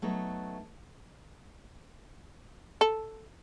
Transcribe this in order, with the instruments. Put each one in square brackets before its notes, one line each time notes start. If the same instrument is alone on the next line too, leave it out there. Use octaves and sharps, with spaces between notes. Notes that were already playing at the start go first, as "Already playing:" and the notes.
[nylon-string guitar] F#3 A3 B3 D#4
[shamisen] A4